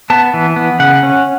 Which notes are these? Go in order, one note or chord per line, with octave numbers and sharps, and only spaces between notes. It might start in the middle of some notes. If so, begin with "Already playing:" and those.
B3 A5
E3
B3
C#3 F#5
C#4